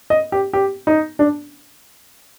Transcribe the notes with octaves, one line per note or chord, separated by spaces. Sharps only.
D#5
G4
G4
D#4
D4